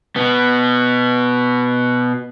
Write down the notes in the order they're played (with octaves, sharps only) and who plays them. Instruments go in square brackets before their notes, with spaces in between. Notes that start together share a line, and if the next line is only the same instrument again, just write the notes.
[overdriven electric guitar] B2 B3